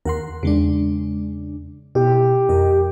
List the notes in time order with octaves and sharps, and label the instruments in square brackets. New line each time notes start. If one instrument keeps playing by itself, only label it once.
[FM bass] D#2 [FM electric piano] A#4 F#5 C6
[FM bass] E2 [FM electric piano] C#3 G#3 D4
[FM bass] B2 [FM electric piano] E4 [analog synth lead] G4
[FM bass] F2 [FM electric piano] A#4 D#5